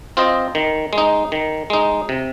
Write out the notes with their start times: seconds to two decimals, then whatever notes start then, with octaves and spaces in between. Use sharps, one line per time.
0.17 C4 F4 C5 D#5
0.55 D#3
0.93 G#3
0.98 D#4
1.32 D#3
1.70 G#3 D#4
2.09 C3